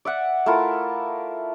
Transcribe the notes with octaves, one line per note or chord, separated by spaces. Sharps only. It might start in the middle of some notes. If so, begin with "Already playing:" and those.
D5 E5 F#5
A3 E4 F4 A#4